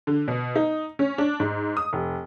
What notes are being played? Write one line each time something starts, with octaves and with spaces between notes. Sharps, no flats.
D3
B2
D#4
C#4
D4
G#2
D#6
F1